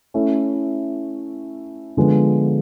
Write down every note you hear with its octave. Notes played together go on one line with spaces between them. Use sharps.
A3 C#4 E4
D3 F3 G#3 B3